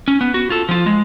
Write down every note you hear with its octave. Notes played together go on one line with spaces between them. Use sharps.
C#4
B3
F#4
F4 A4
F3 F4
G#3